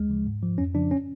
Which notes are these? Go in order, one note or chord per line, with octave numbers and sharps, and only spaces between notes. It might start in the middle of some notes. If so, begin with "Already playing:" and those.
Already playing: D2 G#3
C#3 F3
G#2
F3
F2 C#4
C#3 F3 D4
C#4